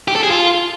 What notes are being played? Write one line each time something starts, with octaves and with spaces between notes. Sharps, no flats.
G4
A4
G#4
F4